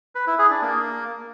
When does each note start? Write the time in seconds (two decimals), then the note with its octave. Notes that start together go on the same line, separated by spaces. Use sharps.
0.15 B4
0.27 E4
0.39 G#4
0.50 D4
0.62 A#3